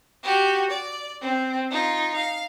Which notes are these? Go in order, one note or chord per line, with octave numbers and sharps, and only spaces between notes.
F#4 G4
D5
C4
D#4 F4
F5